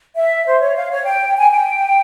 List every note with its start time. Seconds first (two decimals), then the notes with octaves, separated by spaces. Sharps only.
0.16 E5
0.46 C5
0.61 C#5
0.76 F5
0.91 C#5
1.06 G5
1.37 G#5
1.51 G5